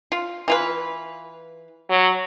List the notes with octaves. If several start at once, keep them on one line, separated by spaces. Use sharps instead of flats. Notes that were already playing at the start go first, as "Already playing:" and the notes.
F4
E3 F4 B4
F#3